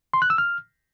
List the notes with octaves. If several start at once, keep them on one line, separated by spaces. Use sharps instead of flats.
C6
F#6
E6
F6